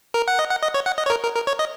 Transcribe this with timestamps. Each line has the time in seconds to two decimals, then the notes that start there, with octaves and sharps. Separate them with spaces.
0.14 A#4
0.28 F#5
0.39 D#5
0.50 F#5
0.63 D#5
0.74 C#5
0.86 F#5
0.98 D#5
1.06 C#5
1.10 A#4
1.23 A#4
1.35 A#4
1.47 C#5
1.59 D#5